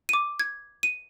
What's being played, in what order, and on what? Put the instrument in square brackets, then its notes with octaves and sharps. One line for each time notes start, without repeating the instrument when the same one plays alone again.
[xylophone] D6 D#7
G#6
D#7